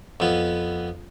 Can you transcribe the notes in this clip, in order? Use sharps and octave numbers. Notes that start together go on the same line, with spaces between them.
F2 B3